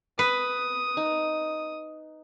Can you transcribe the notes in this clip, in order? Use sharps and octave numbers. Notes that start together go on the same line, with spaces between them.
B4 D#6
D#4